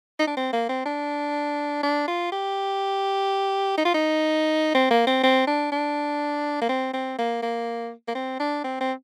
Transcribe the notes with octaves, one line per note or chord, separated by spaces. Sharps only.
D#4
D4
C4
A#3
C4
D4
D4
F4
G4
D#4
F4
D#4
C4
A#3
C4
C4
D4
D4
A#3
C4
C4
A#3
A#3
A#3
C4
D4
C4
C4